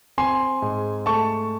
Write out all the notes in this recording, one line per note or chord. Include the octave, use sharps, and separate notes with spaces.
C4 G#5 C6
G#2
A3 A5 C#6